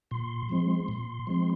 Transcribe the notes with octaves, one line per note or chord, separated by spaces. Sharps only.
A#2 C6
F3 G#3 C4
A#2
F3 G#3 C4